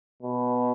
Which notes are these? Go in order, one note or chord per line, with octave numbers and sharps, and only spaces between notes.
B2